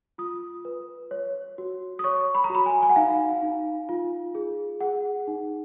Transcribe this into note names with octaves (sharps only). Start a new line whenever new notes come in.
F4 D#6
B4
C#5
F#4
D#6
C#5 C#6
B5
A#5
F#4 B5
G#5
G#5
F#5
D#4 F5
D#4
F4
G#4
G#4 F#5
D#4